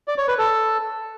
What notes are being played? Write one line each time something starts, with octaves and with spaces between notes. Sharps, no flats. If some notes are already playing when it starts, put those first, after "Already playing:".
D5
C#5
B4
A4